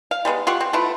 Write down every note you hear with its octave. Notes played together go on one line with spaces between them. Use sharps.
F5
G3 G#3 A#3 B3
F4 G4 F#5 C#6
C4
A3 B3 E4 F4